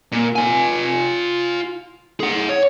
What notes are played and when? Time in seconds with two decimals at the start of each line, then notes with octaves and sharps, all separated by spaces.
0.12 A#2
0.36 F4 G#5
2.20 G#4 F#5
2.49 C#5